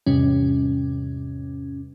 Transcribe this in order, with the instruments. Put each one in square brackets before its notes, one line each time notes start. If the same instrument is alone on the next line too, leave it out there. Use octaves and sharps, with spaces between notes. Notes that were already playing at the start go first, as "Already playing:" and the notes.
[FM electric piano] E2 G#2 C3 G3 C#4